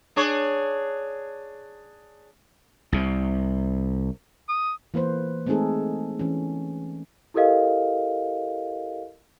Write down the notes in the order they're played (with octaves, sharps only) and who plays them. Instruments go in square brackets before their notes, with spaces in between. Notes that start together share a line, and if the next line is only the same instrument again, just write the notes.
[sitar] D4 G#4 C#5
[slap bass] C2 C3
[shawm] D#6
[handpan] E3 A#3 B4 C5
G#3 A3 C4 D#4 G#4 A4
E3 C#4
[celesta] E4 G4 A4 A#4 D#5 F5